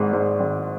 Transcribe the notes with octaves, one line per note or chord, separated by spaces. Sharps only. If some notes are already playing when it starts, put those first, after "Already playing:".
Already playing: G#1 G#2
G#2
G#1